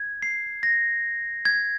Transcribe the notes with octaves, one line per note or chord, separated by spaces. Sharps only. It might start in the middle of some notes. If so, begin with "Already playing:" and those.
Already playing: G#6
C7
A#6
G#6